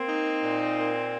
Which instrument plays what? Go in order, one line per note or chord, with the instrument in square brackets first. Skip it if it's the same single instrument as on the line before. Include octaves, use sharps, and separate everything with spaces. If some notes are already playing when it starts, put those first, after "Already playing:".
Already playing: [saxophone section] A#3 [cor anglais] C4
[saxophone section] D#4
A#2
A#3